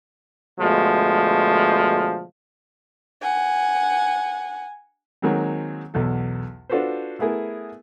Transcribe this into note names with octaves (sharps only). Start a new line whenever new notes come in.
B2 D3 F3 G#3 A3
F#5 G#5
D#3 F#3 G#3 A#3 C4
B1 E2 A4
D4 F4 F#4 A4 B4 C5
A3 B3 E4 G#4 A#4